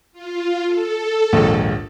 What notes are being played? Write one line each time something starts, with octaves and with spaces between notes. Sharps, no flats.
F4
A4
A#1 D#2 G#2